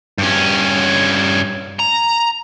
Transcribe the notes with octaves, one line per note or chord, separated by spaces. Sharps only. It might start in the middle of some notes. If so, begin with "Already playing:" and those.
G2 C#4
A#5